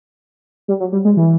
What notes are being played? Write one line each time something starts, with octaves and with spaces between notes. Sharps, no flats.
G3
F#3
G3
G#3
E3